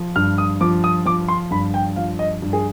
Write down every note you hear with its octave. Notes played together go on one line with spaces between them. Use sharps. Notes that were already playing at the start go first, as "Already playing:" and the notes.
Already playing: F3
G2 F6
D#6
F3 D6
D#6
F3 D6
C6
G2 B5
G5
F3 F5
D#5
G2
G#4